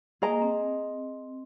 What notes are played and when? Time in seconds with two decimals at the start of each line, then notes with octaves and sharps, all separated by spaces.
0.22 A#3 G#4 D#5 A#5
0.42 C4